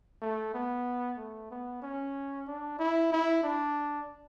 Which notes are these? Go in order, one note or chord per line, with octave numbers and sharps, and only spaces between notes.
A3
B3
A3
B3
C#4
D4
E4
E4
D4